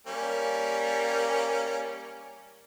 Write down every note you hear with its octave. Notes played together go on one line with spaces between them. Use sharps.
G3 A#3 C#4